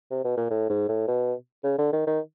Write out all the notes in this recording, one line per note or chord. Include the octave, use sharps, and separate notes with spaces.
C3
B2
A#2
A2
G#2
A2
B2
C#3
D3
D#3
D#3